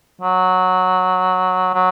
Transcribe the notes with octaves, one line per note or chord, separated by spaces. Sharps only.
F#3
F#3